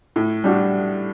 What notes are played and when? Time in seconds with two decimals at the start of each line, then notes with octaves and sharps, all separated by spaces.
0.16 A2
0.44 G3 D4 F#4